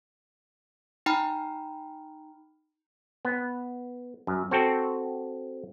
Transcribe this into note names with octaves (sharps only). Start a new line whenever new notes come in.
D#4 G5 A#5 B5 F6
B3
F#2
C4 F#4 A4 G5 A5